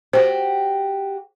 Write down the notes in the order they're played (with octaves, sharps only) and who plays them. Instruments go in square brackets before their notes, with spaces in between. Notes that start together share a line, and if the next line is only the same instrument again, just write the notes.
[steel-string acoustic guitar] F#4 G4 [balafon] C5